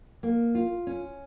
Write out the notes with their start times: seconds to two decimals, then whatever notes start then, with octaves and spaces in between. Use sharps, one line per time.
0.23 A#3
0.55 F4
0.87 C#4